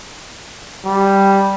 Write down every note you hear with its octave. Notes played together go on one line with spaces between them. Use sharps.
G3